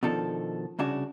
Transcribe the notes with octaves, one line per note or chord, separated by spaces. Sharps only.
B2 D#3 F3 D4 A4
C2 C#3 D4 F#4